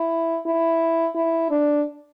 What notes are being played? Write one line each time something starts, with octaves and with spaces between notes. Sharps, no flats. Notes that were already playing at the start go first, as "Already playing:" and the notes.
Already playing: E4
E4
E4
D4